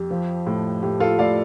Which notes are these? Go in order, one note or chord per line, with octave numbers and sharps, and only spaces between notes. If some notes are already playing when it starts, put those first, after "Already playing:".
Already playing: F2 G4
F3
A2
A2 G4
F4 A4
A2 D5 F5